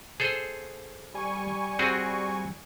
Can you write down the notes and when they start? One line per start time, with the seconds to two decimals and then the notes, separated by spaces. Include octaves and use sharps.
0.20 G#4 A4 C5
1.14 G3 G#5 C#6
1.79 C4 F#4 G#4